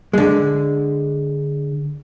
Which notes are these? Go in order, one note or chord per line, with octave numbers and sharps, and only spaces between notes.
D3 G#3